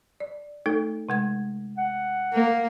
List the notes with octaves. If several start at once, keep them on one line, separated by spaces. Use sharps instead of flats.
D5
A3 D#4 A4
C3 G#3 G#6
F#5
A#3